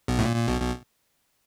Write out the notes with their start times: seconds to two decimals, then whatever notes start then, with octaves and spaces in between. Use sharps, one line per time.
0.08 B1 B2
0.19 A2
0.25 A#2
0.36 A#2
0.48 B1 B2
0.60 B1 B2